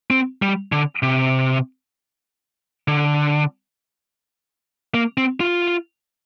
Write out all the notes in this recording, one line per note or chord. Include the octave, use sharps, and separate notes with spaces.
C4
G3
D3
C3
D3
A#3
C4
F4